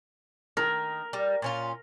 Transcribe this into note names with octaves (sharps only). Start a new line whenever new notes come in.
D#3 A#4
G3
A#2 C#4 F4